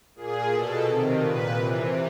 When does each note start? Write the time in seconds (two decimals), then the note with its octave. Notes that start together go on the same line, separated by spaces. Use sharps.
0.16 A#2 G#4
0.50 B2 A4
0.85 C3 D#3
1.20 A#2 B4
1.54 C3 E3